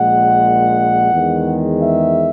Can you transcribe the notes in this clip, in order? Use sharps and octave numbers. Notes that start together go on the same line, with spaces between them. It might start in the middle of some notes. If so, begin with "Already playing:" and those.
Already playing: A#1 A#2 G#3 F#5
E2 D#3 G#3
E5